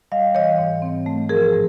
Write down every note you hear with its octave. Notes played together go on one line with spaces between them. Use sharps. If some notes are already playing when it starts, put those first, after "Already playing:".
G3 D#5 F5
E3 C#5 D#5
G#2
C4
A3
F3 G#4 A#4
A2